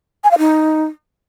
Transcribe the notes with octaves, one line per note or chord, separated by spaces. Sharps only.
G#5
F5
D#4